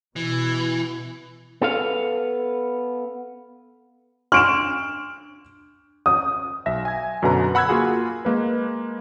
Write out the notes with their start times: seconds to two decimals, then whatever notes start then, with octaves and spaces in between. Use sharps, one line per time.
0.16 B2 E3
1.62 B3 A4 F5
4.32 D4 C6 C#6 F6 D7 E7
6.06 D#6
6.66 B1 E5 A#6
6.85 G#5 G#6
7.22 F#2 B2 D3 B4 A#5
7.55 F#5 B5 E6 F#6 G#6
7.69 A#3 F4 F#4 G#4
8.25 G#3 A#3 B4